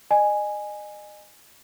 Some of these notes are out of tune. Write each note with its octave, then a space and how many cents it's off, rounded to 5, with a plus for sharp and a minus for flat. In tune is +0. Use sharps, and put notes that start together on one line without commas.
D#5 -35 G#5 +0